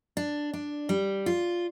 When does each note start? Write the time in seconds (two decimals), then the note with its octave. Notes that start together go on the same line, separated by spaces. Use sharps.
0.17 D4
0.53 D4
0.89 G3
1.26 F4